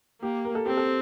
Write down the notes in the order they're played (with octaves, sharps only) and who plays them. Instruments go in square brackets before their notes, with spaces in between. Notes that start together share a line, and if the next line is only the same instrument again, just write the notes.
[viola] A#3 [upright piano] G4
[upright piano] A#4
A4
[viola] C4 [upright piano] G4
[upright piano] A4